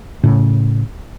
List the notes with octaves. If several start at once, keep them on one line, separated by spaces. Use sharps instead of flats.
A2 C#3